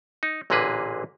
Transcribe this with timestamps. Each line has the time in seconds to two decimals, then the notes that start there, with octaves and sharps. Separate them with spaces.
0.23 D#4
0.50 A1 A#2 D3 A#3 G#4 B4